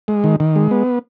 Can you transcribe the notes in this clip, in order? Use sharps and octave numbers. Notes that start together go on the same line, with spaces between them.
G#3
D#3
D#3
G#3
B3